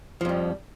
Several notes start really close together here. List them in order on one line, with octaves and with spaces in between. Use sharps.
F3 F2 G3